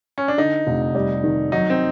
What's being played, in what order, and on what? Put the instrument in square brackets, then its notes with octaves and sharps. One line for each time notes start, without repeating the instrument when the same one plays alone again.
[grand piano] C#4
D4
[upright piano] D3 [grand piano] D#4
[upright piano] F1
G3
D#3
[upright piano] F#3 [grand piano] D#4
[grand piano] C4